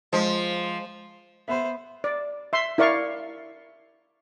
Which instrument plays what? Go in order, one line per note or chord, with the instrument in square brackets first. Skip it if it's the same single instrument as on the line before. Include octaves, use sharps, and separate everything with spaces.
[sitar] F3 [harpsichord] G#3
[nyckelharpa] B3 C5 [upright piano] E5 B5
[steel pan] D5
E5 C6
E4 A#4 D5 F5 C#6